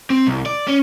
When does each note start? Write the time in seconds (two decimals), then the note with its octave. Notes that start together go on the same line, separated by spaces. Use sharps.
0.10 C4
0.27 C2
0.46 D5
0.67 C#4